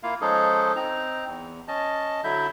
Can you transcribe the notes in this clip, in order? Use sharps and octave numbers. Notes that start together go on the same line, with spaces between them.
A#3 E4 F4 F5
F3 G#3 C#4 D#4 G#4 A4
C4 D#4 A#5
E2
C#4 D#5 A5
D3 F#3 E4 E5 G6